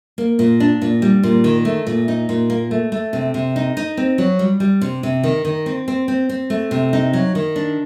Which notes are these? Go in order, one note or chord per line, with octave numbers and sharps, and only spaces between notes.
A#3
A#2
D4
A#2
G3
A#2
D#3
A3
A#2
D#4
A#2
A#3
A3
A3
C3
C3
D#4
D#4
C4
F#3
G3
G3
C3
C3
D#3
D#3
C4
C4
C4
C4
A3
C3
D#4
F#3
D#3
D4